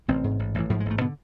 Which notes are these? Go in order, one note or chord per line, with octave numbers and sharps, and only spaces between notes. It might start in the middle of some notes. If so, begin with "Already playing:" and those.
A1 C3 C4
G#2
A1
A1 E3
G#2 F3
G#3
A1 A3
B2 D3 B3